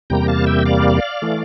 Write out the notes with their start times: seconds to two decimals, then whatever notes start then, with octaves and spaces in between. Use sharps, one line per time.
0.10 E2 C3 G3 A#3 G5 A#5
0.28 F5 A5
0.46 E5 G5
0.66 D5 F5
1.22 E3 A3